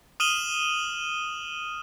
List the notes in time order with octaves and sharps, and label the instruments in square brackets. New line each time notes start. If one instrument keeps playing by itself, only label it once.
[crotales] D#6 F6 D#7 E7 F#7 G7